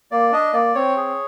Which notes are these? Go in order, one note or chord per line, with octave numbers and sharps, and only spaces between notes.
A#3 D5
D4 D#5
A#3 D5
C4 C#5
G#4